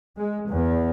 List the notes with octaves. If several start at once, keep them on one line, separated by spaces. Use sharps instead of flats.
G#3
E2